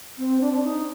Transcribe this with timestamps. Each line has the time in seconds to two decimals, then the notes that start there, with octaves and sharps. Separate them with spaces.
0.18 C4
0.41 D4
0.53 D4
0.63 D#4